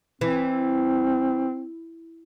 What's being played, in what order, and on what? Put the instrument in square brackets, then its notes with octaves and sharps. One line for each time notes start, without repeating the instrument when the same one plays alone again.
[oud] E3 [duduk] C4